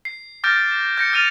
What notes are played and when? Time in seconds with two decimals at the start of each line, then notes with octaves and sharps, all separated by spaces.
0.05 C7
0.44 D6 F6 G6 A6 A#6 D7
0.71 E7
0.98 G6 A#6 C#7
1.13 F6 A6 D#7 F7